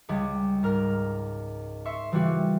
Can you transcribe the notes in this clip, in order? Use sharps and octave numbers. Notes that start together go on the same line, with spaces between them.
C#2 G3 G#3
G#2 A#4 F6 A#6
E5 C6 C#6
C#3 E3 G3 C4 F4 F#4